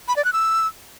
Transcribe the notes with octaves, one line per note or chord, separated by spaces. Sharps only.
B5
D5
F#6
E6